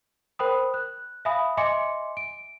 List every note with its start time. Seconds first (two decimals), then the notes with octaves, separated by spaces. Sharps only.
0.39 A#4 C5 G5 B5 D#6
0.74 F#6
1.25 E5 F5 G#5 B5 D#6
1.57 D#5 E5 G#5 C6 D6 C#7
2.17 D7